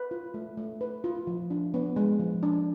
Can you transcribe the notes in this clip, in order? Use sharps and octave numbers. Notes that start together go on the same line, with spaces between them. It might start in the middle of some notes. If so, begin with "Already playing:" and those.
Already playing: B4
F4
A3
A3
B4
F4
F3
D4
B3
G#3
F3
D4